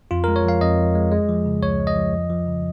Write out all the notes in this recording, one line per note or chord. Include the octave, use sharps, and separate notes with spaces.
F2 F4
G#3 A#4
C#5
F3 F5
F2 D#5
F2
G#3
G#3
F3
C#3
C#2 C#5
G#3
D#5
F3
F2
F3
C#3